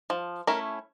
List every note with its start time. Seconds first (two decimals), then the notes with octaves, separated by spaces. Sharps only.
0.10 F3
0.47 A3 C#4 E4 A#4